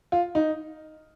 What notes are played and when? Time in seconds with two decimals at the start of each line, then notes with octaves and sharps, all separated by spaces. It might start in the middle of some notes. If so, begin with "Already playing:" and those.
0.12 F4
0.35 D#4